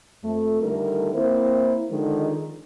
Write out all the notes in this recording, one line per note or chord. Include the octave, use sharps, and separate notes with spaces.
F2 A3
D3 D#3 G3 A3 E4 A#4
A#3 C4 E4 C5
D3 D#3 F3 G#3